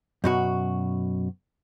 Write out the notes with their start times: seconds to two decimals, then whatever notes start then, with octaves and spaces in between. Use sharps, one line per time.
0.24 F#2 B2 F#4